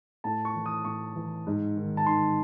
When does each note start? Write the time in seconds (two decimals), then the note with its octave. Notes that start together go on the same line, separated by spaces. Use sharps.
0.24 A2 A5
0.45 C#6
0.56 E3
0.66 D#6
0.85 A2 C#6
1.16 E3
1.47 G#2
1.77 D#3
1.97 A5
2.06 D#3 C6